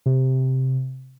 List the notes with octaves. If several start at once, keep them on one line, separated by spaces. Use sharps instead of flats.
C3